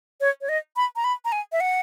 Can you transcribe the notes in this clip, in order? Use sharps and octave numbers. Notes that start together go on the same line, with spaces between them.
C#5
C#5
D#5
B5
A#5
B5
A#5
G#5
E5
F#5